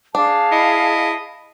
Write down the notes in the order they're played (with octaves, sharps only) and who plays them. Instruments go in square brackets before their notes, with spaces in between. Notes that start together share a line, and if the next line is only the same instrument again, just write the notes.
[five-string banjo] D4 [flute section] G#4 F5 A5
[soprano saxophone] E4 [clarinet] D#5